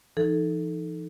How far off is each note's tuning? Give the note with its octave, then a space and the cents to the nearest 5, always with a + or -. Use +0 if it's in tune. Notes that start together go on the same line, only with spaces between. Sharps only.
E3 +40 D#4 +0 A4 +0